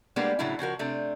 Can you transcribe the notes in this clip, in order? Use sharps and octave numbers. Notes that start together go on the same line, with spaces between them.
G3 G#3 A#3 B3 D4
A2 C#3 F#3 C#4 D4 E4
C#3 F3 F#4 A#4
C3 A3 D4